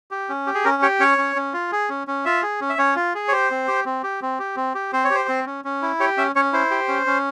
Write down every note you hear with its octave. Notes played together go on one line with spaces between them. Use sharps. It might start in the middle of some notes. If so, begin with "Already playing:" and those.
G4
C#4
G4
G#4
C#4 A#4
G4 C#5
C#4 C#5
C#4
C#4
F4
G#4
C#4
C#4
F4 E5
G#4
C#4
E5
C#4 C#5
F4
G#4
C#5
G4 C5
C4
G4
C4
G4
C4
G4
C4
G4
C4 C5
C#5
G4 C5
C4
C#4
C#4
E4
G4 C#5
C#4 E5
C#4 C#5
E4 C5
G4
C#4
C#4